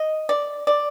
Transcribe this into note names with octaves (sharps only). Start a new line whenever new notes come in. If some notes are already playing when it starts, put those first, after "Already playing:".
Already playing: D#5
D5
D5